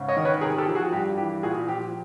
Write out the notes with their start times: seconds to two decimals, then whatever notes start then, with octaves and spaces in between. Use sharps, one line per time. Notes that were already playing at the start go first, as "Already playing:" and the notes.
Already playing: G#2 C#3
0.08 C#5 D#5
0.17 D#3
0.25 B4 C#5
0.41 C3 G#4 A#4
0.58 G4 A4
0.68 F3
0.75 F#4 G#4
0.92 G2 G4
1.18 E3 G4
1.43 A#2 F#4 G#4
1.68 F3 G4